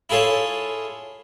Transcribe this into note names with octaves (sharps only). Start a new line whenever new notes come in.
E4 F4 G#4 A4 C#5